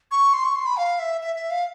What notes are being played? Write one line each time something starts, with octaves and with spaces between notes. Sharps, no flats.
C#6
C6
C#6
C6
B5
F5
E5
E5
E5
F5